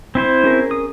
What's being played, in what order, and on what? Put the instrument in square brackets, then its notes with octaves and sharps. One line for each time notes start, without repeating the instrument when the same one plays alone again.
[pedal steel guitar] C4 E4 C5
[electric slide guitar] C#4 G#4 A#4
[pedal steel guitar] D#6